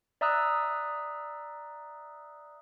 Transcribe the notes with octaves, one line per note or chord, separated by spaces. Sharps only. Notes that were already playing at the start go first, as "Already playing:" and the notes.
D5 E5 A#5 D#6 E6 F#6